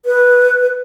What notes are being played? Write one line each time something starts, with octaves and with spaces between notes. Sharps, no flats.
B4